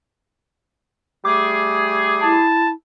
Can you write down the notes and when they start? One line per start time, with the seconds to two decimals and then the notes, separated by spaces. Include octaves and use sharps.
1.25 G3 A3 G#4 D6
2.23 E4 A5